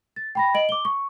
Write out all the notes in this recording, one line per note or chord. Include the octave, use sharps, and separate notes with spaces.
A6
G5 B5 A#6
D#5 D7 F#7
D6 G7
C#6